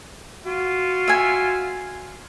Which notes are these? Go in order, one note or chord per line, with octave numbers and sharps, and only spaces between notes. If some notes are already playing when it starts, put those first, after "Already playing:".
F4 F#4
E5 G#5